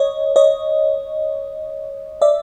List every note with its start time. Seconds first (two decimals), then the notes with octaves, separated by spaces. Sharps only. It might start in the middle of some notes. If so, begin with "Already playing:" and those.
Already playing: C#5 D#5
0.36 C#5 D#5
2.22 D5 E5